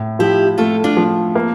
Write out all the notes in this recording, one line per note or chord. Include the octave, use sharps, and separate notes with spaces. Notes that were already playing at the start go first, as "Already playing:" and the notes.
Already playing: A2
F3 E4 G4
A3 F4 A4
D4 F4
F3
A#3